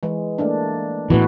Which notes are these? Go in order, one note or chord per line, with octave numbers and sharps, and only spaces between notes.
E3 G#3
A3 A#3 D4
A2 E3 B3 F#4 B4